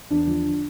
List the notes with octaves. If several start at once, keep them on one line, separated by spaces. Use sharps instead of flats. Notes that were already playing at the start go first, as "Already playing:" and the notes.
E2 D4
F3
D3